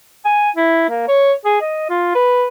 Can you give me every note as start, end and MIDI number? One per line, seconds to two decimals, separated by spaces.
0.25 0.50 80
0.56 0.86 64
0.89 1.08 58
1.08 1.33 73
1.45 1.59 68
1.61 1.87 75
1.89 2.12 65
2.15 2.47 71